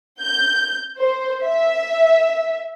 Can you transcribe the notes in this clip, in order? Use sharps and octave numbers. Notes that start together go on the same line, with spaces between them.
G6
C5
E5